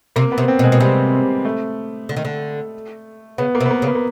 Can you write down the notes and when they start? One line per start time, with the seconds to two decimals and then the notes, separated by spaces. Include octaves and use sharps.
0.16 C3 A#3
0.32 B3
0.38 C3
0.48 C4
0.59 B2
0.64 G#3
0.72 B2
0.80 C3 G3
1.45 A3
2.09 D3
2.16 D#3
2.25 D3
3.38 C#3 B3
3.55 A#3
3.60 C3
3.66 B3
3.71 A#3
3.82 C#3
3.87 B3
3.95 A#3